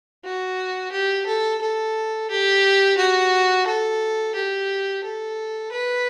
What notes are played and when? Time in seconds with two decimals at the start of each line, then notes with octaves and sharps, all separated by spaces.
0.24 F#4
0.92 G4
1.26 A4
1.61 A4
2.30 G4
2.98 F#4
3.67 A4
4.35 G4
5.03 A4
5.72 B4